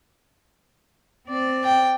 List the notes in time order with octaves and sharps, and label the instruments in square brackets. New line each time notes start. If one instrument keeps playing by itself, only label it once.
[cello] C4 D5
[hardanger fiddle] G5